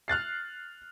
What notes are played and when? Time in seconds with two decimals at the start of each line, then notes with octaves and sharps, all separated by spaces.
0.08 F6 F#6 A6 C7